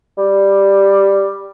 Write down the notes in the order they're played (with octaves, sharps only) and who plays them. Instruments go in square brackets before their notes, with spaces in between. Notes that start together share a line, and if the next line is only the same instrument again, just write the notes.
[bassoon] G3